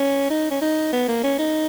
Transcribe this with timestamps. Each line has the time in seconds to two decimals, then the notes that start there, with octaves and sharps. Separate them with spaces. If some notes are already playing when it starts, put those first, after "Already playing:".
Already playing: C#4
0.30 D#4
0.51 C#4
0.62 D#4
0.93 B3
1.08 A#3
1.24 C#4
1.39 D#4